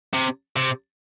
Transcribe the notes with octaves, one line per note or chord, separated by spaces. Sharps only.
C3
C3